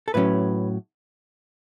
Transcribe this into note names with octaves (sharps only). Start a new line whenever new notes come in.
A4
A2 F#3 C#4 B4